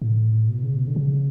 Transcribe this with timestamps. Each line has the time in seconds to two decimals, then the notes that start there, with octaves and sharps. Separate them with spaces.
0.02 A2
0.49 B2
0.63 C#3
0.76 B2
0.87 D3
0.96 C#3